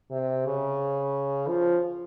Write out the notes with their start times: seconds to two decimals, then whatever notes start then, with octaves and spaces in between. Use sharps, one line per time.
0.11 C3
0.46 C#3
1.48 F3